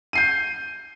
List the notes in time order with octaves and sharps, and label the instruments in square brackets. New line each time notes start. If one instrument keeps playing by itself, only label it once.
[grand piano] G6 C7 D#7